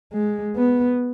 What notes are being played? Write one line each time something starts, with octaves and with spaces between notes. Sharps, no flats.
G#3
B3